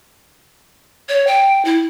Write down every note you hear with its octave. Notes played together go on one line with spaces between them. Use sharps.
C#5
G5
E4